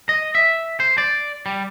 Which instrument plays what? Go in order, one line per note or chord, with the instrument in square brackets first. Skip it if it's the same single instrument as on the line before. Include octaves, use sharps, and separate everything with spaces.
[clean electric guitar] D#5
E5
C5
D5
G3